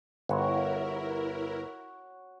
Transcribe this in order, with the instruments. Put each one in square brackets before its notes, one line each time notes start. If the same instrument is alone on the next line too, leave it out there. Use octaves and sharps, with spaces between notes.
[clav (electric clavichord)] G1 [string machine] E4 A#4 [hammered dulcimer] F#4 C#5